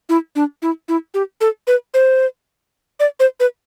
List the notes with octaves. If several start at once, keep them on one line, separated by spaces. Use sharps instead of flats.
E4
D4
E4
E4
G4
A4
B4
C5
D5
C5
B4